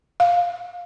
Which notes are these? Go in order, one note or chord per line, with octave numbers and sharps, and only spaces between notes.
F5